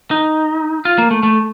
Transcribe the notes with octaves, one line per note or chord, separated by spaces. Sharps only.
D#4
F4
A#3
A3
A3